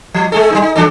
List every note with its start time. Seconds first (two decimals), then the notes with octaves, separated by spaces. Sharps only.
0.14 F3
0.32 G#3 G#4 A4
0.50 G3 A#3 D#4
0.62 D#4
0.76 E3 D4 A4